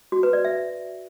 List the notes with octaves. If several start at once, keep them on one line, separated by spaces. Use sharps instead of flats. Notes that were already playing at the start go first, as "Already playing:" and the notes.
F#4
B4
D5
E5